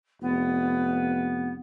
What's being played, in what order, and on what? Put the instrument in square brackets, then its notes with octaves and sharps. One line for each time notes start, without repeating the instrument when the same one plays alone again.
[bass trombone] F1 [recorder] B3